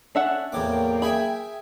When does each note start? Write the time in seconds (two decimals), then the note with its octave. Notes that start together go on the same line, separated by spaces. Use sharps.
0.15 C#4 D4 A4 E5 F#5
0.52 E2 A2 F#3 A#3 G5 D6
1.02 G#4 E5 B5